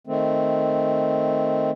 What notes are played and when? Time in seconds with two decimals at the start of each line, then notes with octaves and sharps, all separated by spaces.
0.07 D#3 A3 C4